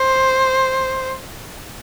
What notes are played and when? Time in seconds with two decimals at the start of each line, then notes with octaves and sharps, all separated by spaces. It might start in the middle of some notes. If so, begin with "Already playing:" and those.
Already playing: C5